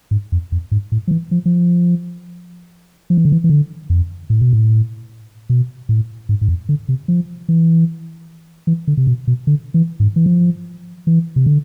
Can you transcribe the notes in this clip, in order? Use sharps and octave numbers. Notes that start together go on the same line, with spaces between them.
G#2
F2
F2
G#2
A2
F3
E3
F3
F3
F3
E3
D3
E3
E3
D3
F2
A2
B2
A2
B2
A2
G#2
G#2
F2
D3
C3
F3
E3
E3
D3
C3
B2
B2
D3
E3
G#2
E3
F3
E3
C3
D3